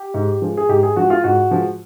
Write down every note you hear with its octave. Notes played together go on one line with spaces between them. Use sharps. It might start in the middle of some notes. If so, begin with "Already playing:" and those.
Already playing: G4
G#2
F3 G#3
G#4
G#2 G4
G#4
F3 G#3 F#4
F4
G#2 F#4
F3 G#3